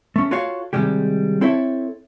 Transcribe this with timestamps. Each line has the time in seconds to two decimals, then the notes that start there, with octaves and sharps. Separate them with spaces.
0.16 A3 C#4
0.31 F4 F#4 A4 C#5 F5
0.73 C3 D#3 G3 G#3 G4
1.41 C4 E4 A4 C#5 E5